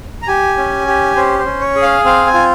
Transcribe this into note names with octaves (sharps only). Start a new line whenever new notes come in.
A#5
G4 G#5
C#4
G4
C#4 C5
C5
C#4
C#5
G#4
F5
C4 F5
G#5
F4